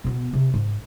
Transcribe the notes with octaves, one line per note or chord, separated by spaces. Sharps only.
B2 B3
C3
G#2